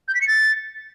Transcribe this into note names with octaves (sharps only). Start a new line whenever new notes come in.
G6
B6
C#7
A6